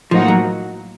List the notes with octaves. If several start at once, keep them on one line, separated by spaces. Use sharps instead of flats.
A2 F3 F#3 A#3 D#4 F#4
F#3